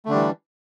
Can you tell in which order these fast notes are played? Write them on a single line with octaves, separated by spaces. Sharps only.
A3 D3 D4 G3 E3